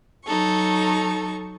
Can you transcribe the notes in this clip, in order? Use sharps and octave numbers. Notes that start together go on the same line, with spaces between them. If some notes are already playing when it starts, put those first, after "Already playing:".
F#3 D#4 A4 C#6